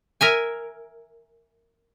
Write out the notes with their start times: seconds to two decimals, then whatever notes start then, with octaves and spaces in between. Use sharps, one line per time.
0.21 A#4 E5 G#5